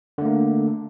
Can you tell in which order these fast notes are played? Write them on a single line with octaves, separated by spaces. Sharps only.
D3 A3 A#3